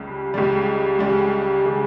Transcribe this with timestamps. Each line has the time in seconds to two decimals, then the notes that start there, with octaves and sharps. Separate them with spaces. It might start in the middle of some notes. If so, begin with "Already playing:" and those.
Already playing: C#2 C#3 G3
0.34 C#2 C#3 G3
0.99 C#2 C#3 G3
1.66 C#3 G3